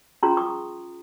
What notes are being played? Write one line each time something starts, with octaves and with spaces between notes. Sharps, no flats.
C#4 F4 G#4 A#5 C6
C#6 D#6